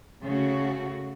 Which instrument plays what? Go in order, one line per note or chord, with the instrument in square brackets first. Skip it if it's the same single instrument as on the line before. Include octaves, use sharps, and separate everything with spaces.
[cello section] C#3 A3 F#4